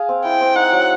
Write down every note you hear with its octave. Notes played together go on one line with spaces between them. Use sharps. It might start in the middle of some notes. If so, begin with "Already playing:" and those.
Already playing: G#4 F5
C4
E4 G5
C4
D#4 F#5
F#3